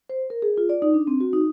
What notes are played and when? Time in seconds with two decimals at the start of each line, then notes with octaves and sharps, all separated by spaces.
0.09 C5
0.30 A#4
0.42 G#4
0.57 F4
0.69 D5
0.82 D#4
0.94 D4
1.07 C4
1.20 F#4
1.33 D#4